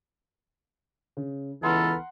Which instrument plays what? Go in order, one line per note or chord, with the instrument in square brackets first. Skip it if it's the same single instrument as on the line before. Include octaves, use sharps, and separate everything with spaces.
[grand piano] C#3
[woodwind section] C#2 B3 F6 [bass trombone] E3 [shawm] A4 [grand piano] F#5 A#5 C6